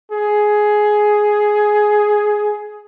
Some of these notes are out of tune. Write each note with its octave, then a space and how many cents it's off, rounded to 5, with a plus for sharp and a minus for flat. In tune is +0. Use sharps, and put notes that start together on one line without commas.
G#4 +10